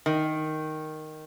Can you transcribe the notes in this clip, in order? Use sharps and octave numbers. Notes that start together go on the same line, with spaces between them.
D#3